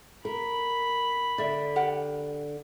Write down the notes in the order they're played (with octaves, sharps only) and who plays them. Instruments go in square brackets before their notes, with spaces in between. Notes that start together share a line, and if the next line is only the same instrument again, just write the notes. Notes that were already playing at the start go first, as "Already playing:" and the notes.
[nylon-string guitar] A#4 [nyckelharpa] B5
[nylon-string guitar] D3 [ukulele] D5 E5
[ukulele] G4 A#4 F#5